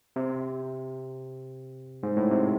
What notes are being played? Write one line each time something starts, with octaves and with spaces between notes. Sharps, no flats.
C3
G#2
A2
C3